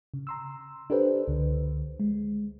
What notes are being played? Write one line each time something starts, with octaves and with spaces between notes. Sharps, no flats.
C#3
A#5 C6 E6
D4 G4 A4 B4 C5
C#2 D3
G#3